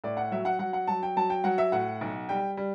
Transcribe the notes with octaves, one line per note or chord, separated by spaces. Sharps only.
A2 D5
F#5
F#3 E5
F#5
F#3 F#5
F#5
F#3 A5
G5
F#3 A5
G5
F#3 F#5
E5
A2 F#5
B1
G3 G5
G3